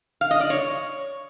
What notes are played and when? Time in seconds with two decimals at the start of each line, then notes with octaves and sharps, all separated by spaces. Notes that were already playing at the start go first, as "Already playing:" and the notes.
0.21 F5
0.31 D#5
0.40 D5
0.50 C#5